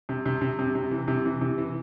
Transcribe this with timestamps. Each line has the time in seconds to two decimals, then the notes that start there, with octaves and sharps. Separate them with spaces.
0.09 C3
0.26 C3
0.41 C3
0.59 C3
0.75 C3
0.91 E3
1.08 C3
1.25 E3
1.41 C3
1.58 E3